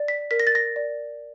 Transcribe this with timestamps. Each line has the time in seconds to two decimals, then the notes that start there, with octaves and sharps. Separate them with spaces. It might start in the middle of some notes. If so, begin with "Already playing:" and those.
Already playing: D5
0.08 B6
0.31 A#4 B6
0.40 A#6
0.47 A6
0.55 A#6
0.76 D5